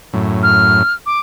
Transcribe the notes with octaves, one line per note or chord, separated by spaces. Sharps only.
F#2 A2
F6
D6